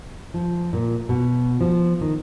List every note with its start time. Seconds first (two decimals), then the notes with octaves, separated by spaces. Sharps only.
0.34 F3
0.73 A#2
1.09 B2
1.61 F3
2.01 D#3